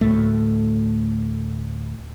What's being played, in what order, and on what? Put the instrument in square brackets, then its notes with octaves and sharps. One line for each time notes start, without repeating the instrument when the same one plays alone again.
[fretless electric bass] D2 A2 A3